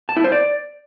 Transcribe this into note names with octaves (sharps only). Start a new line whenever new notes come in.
A5
E4
C5
D5